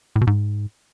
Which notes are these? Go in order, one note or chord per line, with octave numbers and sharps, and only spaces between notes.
A2
B2
G#2